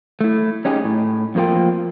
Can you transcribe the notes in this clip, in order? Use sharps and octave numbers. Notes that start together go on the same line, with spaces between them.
A3 E4
C#4 D#4 G4 G#4
A2
F2 F3 A#3 F4 G5